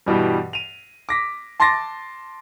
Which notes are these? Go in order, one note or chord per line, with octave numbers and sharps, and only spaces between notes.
G2 B2 E3 G3
D#7 F7
D6 A#6 B6
A5 C6 D6 A6 A#6